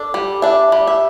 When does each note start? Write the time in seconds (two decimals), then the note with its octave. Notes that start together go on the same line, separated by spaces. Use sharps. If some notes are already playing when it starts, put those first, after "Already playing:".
Already playing: D4 A4
0.14 G3
0.42 D4 E5
0.72 G3
0.87 E5